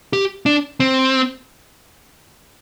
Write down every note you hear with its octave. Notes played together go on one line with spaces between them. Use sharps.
G4
D4
C4